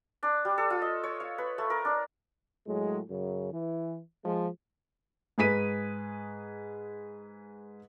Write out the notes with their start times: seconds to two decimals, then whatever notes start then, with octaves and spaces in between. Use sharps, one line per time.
0.23 D4
0.45 G3
0.58 A4
0.70 F4
0.82 D#5
1.03 C#5
1.20 F5
1.38 B4
1.58 A3
1.70 A#4
1.85 D4
2.66 A2 F#3 G#3
3.09 F#2 C#3
3.52 E3
4.25 F3 G#3
5.38 G#2 G#4 B4 B6 D#7